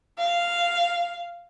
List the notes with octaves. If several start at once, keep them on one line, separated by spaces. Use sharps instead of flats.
F5